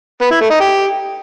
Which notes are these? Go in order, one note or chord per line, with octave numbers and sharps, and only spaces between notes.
B3
E4
A3
D#4
G4